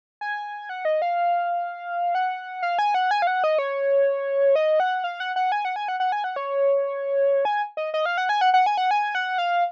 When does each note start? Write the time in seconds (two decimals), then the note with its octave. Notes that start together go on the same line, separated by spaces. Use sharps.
0.21 G#5
0.69 F#5
0.85 D#5
1.02 F5
2.15 F#5
2.63 F5
2.79 G#5
2.94 F#5
3.11 G#5
3.22 F5
3.27 F#5
3.44 D#5
3.59 C#5
4.56 D#5
4.80 F#5
5.04 F5
5.20 F#5
5.36 F#5
5.52 G#5
5.65 F#5
5.76 G#5
5.88 F#5
6.00 F#5
6.12 G#5
6.24 F#5
6.36 C#5
7.45 G#5
7.77 D#5
7.94 D#5
8.06 F5
8.18 F#5
8.29 G#5
8.41 F#5
8.54 F#5
8.66 G#5
8.78 F#5
8.91 G#5
9.15 F#5
9.38 F5